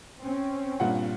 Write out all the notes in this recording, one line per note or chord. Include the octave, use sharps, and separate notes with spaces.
C4 C#4
G2 A#2 F#5